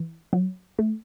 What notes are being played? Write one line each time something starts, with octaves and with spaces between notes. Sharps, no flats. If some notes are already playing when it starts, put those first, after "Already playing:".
Already playing: E3
F#3
A3